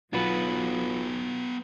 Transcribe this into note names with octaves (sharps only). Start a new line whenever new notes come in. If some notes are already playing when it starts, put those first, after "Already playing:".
B1 F#3 B3 D4 F4 F#4 B4